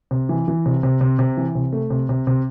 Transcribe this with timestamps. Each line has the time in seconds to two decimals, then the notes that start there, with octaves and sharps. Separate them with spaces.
0.11 C3
0.29 E3
0.48 E3
0.66 C3
0.83 C3
1.01 C3
1.19 C3
1.37 E3
1.55 C3
1.73 A3
1.90 C3
2.09 C3
2.27 C3